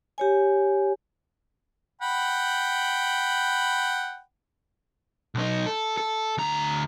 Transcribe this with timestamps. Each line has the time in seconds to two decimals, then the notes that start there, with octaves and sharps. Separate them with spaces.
0.18 G4 C#5 G#5
2.02 F#5 G5 B5
5.35 B1 D#4
5.66 A4
5.97 A4
6.38 D2 A#5